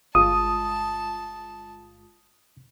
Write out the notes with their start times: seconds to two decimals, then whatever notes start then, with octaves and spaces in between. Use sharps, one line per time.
0.15 G1 G#3 F4 A5 D#6